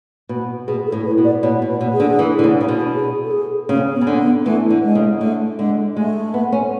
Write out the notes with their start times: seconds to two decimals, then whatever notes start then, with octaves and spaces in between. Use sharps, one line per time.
0.29 B2
0.67 B2 G#4
0.87 A4
0.92 A2
1.05 B4
1.18 B2
1.24 D5
1.43 B2 C#5
1.62 B2
1.68 B4
1.81 B2
1.93 G#4
2.00 D3
2.19 E3
2.39 D3
2.44 C#3
2.61 C#3
2.68 B2
2.94 G#4
3.24 A4
3.32 G#4
3.69 C#3 C#4
3.95 B3
4.01 C#3
4.07 D3
4.20 B3
4.45 E3 A3
4.70 D3
4.83 G#3
4.95 C#3
5.21 D3 A3
5.59 D3 G#3
5.96 G#3 A3
6.34 B3
6.52 C#4